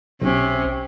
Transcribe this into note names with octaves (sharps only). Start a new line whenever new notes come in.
B1 C3 C#4